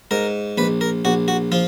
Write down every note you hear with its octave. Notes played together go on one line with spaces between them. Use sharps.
G#2 A#4
A#1 B4
A#4
A#1 F#4
F#4
F3 F4